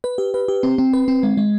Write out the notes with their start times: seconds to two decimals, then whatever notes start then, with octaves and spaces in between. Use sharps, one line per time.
0.04 B4
0.18 G4
0.34 B4
0.48 G4
0.63 C4
0.78 C4
0.93 B4
1.08 C4
1.23 G#3
1.37 G#3